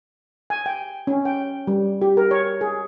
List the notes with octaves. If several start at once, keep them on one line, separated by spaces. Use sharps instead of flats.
G#5
G5
C#4
G5
G3
G4
A#4
C#5
G#4